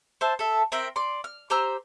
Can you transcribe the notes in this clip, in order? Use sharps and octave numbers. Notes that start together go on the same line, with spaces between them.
C5 E5 A5
A4 E5
C4 A#4 E5 G5
D5 C6
F6
G4 C5 A#5 E6